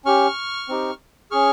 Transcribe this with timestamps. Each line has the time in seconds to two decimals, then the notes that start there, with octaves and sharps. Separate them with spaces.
0.05 C#4 G4 C#6 F6
0.69 C4 D#4 G4
1.31 C#4 G#4 C#6 F6